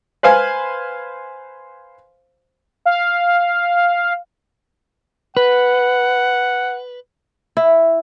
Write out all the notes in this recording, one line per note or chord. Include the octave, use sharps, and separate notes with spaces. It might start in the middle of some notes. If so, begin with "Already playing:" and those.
B4 C5 F5 G#5
F5
B4 F#5
E4